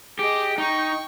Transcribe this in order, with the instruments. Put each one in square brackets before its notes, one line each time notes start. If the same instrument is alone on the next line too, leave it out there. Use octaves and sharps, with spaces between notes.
[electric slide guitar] G4 [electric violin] G#4 D#5
[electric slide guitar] D#4 [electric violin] G5 C#6